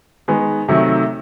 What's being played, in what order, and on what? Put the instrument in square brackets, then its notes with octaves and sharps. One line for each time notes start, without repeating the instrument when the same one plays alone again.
[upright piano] D#3 G#3 B3
C3 D#3 F#3 A3